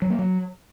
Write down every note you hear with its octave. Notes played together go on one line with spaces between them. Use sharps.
F#3
A#3
F#3